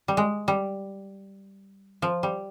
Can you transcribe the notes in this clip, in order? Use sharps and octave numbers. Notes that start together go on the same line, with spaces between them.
G3
G#3
G3
F3
G3